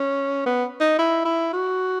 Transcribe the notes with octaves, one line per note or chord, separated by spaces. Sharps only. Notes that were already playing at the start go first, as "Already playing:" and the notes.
Already playing: C#4
B3
D#4
E4
E4
F#4